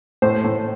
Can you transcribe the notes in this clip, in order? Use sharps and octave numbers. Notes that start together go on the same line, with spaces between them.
A2 C5
A2